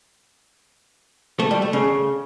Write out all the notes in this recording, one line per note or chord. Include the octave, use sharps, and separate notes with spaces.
A3
G3
A3
C#3